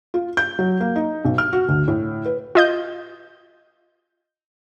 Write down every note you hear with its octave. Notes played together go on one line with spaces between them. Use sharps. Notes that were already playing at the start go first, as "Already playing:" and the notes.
F4
G6
F#3
A#3
D#4
B1
F6
F#4
D2
A2
B4
F4 D#5 G6